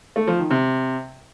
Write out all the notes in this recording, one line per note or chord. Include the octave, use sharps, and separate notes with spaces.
A3
F3
D#3
C3